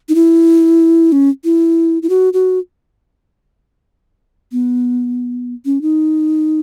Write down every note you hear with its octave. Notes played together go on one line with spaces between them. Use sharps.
D#4
E4
C#4
E4
E4
F#4
F#4
B3
C#4
D#4